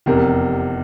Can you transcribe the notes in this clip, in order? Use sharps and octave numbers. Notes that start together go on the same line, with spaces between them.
F1 E2 C3 A#4